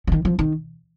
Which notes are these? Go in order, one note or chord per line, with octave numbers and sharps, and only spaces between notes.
D3
D#3
F3
D#3